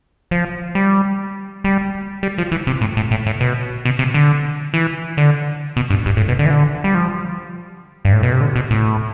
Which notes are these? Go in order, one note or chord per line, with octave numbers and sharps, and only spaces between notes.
F3
G3
G3
G3
F3
E3
C3
A2
A2
A2
A2
B2
B2
C3
D3
E3
D3
B2
G2
G2
A2
B2
D3
E3
D3
G3
F3
G2
A2
B2
C3
D3
B2
A2